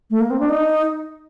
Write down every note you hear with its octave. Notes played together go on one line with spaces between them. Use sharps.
A3
A#3
C4
D4
D#4